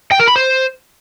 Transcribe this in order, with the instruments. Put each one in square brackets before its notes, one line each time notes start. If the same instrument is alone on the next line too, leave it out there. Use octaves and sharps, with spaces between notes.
[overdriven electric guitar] G5
A#4
B5
C5